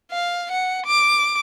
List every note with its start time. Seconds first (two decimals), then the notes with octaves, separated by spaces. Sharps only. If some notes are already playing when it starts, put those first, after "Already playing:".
0.11 F5
0.52 F#5
0.86 D6